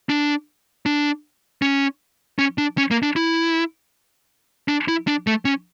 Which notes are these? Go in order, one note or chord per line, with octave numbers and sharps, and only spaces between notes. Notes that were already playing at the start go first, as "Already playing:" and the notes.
D4
D4
C#4
C#4
D4
C#4
A#3
D4
E4
D4
E4
D4
A3
C#4